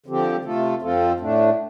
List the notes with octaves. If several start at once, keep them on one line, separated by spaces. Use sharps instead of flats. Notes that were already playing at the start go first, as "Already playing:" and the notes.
D3 F3 C4 G4
C3 A3 F4 A4
F2 F3 C4 F4 A4
A2 A3 D4